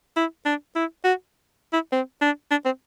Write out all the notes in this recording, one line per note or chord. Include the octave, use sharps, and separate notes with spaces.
E4
D4
E4
F#4
E4
C4
D4
D4
C4